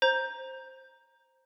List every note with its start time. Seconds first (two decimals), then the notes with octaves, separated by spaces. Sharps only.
0.02 C5 A#5 G6